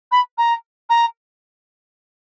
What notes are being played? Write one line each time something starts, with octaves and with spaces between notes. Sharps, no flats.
B5
A#5
A#5